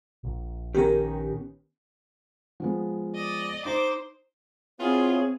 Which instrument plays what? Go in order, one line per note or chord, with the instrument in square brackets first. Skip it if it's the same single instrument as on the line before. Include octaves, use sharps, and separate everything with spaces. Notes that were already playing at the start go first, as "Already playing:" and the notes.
[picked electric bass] A#1
[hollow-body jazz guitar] D#3 B3 C#4 [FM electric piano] G4 A#4
[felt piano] F3 G#3 B3
[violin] D5 D#5
[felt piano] D#4 [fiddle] C5 [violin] D6
[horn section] B3 E4 F4 [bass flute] C4 [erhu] G#4 [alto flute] C#5